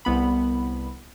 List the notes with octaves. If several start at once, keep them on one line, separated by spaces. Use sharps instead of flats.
C2 B3 B5